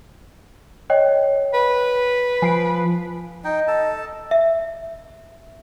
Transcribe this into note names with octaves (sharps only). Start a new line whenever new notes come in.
C#5 D#5 G5
B4
F3 G#5 C7 D7
D#4 D#5 G5
A4 A5
E5